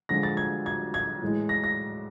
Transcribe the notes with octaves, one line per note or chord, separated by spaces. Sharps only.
D3 F3 G#3 A#6
A6
G#6
G#6
G#6
A2 E3 G#3
A#6
A#6